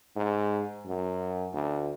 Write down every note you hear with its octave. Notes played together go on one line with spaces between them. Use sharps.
G#2
F#2
D2